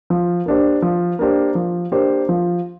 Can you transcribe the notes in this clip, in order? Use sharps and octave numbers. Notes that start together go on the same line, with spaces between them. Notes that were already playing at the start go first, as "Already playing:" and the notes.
F3
A#3 D4 G4 C5
F3
A#3 D4 G4 C5
F3
A#3 D4 G4 C5
F3